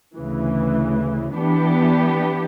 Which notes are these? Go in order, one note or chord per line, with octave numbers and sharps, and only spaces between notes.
D2 C#3 E3
E3 B3 D4 G4